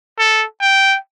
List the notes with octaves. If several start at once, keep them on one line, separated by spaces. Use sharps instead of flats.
A4
G5